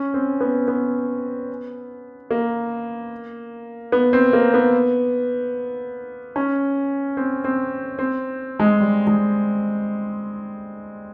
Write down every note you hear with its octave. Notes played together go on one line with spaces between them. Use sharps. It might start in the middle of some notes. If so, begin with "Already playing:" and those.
Already playing: C#4
C4
B3
B3
A#3
B3
C4
A#3
B3
C#4
C4
C4
C4
G#3
G3
G#3